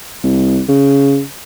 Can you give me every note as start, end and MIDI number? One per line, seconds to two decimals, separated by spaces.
0.24 0.61 36
0.69 1.22 49